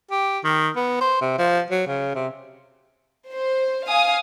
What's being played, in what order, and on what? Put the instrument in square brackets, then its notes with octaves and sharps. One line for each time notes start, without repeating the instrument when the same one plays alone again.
[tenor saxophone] G4
D#3
B3
C5
C3
F3
F#3
C#3
C3
[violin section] C5
F5 G#5 D#6